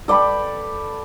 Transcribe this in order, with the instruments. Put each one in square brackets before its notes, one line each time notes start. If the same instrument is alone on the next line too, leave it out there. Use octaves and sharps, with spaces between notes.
[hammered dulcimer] A4 D5 G5 B5